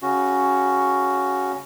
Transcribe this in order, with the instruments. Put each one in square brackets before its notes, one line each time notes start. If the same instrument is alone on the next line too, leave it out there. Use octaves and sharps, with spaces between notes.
[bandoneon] C#3 C#4 F#4